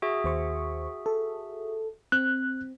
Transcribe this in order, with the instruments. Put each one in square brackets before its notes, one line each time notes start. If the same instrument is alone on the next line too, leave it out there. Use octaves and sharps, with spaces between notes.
[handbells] F#4 G#4 E5
[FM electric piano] D#2 C5 C#6
A4
[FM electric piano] C4 [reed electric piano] F#6